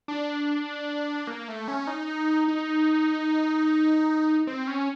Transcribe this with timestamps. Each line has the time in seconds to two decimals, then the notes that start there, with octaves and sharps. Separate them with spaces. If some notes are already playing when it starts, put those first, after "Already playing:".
0.08 D4
1.27 A#3
1.48 A3
1.68 C#4
1.87 D#4
2.48 D#4
4.47 C4
4.67 C#4